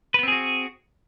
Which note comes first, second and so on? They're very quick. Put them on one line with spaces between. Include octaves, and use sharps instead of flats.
B4 B3 C4 G#4 F#4